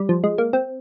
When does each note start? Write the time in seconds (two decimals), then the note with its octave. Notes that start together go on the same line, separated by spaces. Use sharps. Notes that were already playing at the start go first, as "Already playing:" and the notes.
Already playing: G3
0.09 F3
0.24 G#3
0.38 A#3
0.53 C4